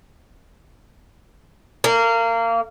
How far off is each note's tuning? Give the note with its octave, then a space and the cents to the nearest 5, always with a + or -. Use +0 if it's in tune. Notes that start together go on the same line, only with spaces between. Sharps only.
A#3 -25